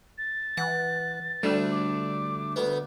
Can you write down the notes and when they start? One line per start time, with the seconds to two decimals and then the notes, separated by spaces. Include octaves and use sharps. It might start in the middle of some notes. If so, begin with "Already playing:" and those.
0.18 A6
0.57 E3 F#5
1.43 D2 D3 G3 A3 D4
1.71 D6
2.56 D2 B3